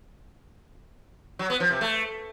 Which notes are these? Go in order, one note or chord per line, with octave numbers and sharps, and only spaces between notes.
F#3
B3
F3
C3
A3